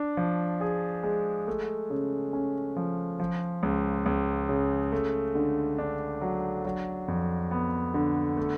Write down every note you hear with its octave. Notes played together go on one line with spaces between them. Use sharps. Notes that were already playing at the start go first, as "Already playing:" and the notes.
Already playing: D4
F3
G#4
G#3
A3
C#3
C#4
F3
F3
C#2
C#2
C#3
A3
D3
D4
F#3
F#3
F2
B3
D3
A3